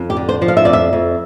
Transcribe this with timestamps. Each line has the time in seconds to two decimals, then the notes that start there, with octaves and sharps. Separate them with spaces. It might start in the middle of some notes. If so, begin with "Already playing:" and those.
Already playing: F2
0.10 G4
0.17 D3
0.29 C5
0.42 F3
0.48 F5
0.57 E5
0.65 F2 D5
0.73 E5
0.93 F2